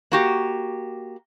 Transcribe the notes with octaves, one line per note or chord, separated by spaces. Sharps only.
A#3 F#4 G4